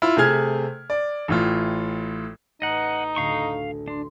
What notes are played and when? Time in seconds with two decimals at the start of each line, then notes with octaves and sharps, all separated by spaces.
0.02 E4 F4
0.17 C3 A3 G#4 F6 G#6
0.90 D5
1.28 A1 A2 F4
2.62 A1 D#4 D#5 F#5
3.16 D2 A2 D3 F5 C#6
3.88 D4 C6